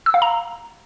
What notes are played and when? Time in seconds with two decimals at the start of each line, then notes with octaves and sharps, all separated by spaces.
0.06 E6
0.14 F5
0.22 A#5